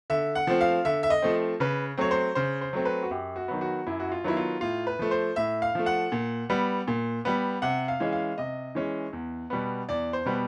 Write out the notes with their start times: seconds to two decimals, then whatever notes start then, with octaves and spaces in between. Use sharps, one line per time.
0.10 D3 E5
0.35 F#5
0.47 F3 A3 C4
0.61 F5
0.85 D3 E5
1.03 E5
1.10 D#5
1.22 F3 A3 C4
1.60 C#3 B4
1.98 F#3 A3 C4 C#5
2.11 C5
2.35 C#3 C5
2.61 C5
2.73 F#3 A3 C4
2.85 B4
3.03 F#4
3.11 F#2 G4
3.36 F#4
3.48 D#3 F#3 B3
3.61 F#4
3.87 F#2 E4
4.00 F#4
4.12 F4
4.24 D#3 F#3 B3 E4
4.37 F4
4.61 A2 F4
4.87 B4
4.99 F3 A3
5.11 C5
5.36 A2 E5
5.62 F5
5.75 F3 A3
5.86 F#5
6.12 A#2
6.50 G3 B3
6.87 A#2
7.25 G3 B3
7.62 C3 F#5
7.88 F5
8.00 E3 G#3 C#4
8.12 F5
8.38 C3 D#5
8.75 E3 G#3 C#4
9.13 E2
9.50 B2 G3 B3
9.89 E2 D5
10.13 C5
10.26 B2 G3 B3